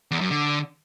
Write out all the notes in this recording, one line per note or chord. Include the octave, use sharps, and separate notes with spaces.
E2
F#2
D3